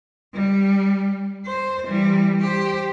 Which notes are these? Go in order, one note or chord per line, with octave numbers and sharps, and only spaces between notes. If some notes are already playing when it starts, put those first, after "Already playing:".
G3
C5
E3 G3
G4 C5